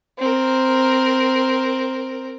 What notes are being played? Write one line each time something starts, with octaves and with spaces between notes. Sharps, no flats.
C4 A#4